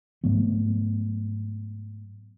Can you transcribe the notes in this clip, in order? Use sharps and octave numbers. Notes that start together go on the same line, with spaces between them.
G#2 F#3 A3 B3